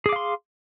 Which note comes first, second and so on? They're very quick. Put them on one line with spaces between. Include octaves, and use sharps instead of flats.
G#4 D6 F5 C6